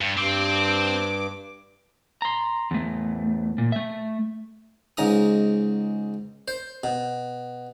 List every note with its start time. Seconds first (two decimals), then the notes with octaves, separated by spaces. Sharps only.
0.01 G2
0.17 G2 C4 D6
2.22 A#5 C6
2.71 E2 A3
3.58 A#2
3.72 A3 E5
4.97 C#2 G#2 A#5 D#6
6.48 C5
6.84 B2